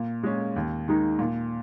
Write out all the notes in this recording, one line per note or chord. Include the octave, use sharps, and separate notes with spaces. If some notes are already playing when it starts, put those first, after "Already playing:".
Already playing: A#2
G#3 C#4
D#2
D#3 G#3 D#4
A#2